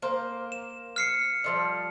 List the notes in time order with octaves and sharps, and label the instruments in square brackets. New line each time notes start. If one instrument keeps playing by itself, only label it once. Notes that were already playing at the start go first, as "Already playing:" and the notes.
[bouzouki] A#3 C5
[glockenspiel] E7
F6 C7 C#7
[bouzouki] D3 F3 G3